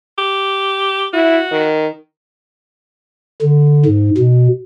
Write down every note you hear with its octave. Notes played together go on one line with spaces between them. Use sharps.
G4
E4 F#4
D#3
D3
G#2
B2